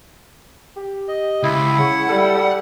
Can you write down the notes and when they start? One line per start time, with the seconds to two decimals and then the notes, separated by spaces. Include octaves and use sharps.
0.76 G4
1.08 D#5
1.43 C#2 E4
1.78 C#3 F#5
2.09 G3 A4